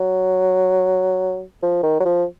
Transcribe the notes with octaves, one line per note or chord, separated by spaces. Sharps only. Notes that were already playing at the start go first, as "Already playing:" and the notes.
Already playing: F#3
F3
D#3
F#3
F3